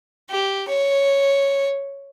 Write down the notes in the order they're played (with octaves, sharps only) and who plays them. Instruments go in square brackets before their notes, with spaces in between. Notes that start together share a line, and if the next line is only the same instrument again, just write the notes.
[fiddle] G4
C#5